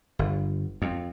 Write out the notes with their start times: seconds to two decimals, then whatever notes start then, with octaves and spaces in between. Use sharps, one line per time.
0.19 G1
0.82 F2